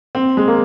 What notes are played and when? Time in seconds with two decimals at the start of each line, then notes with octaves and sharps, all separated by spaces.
0.15 C4
0.37 G#3
0.48 A#3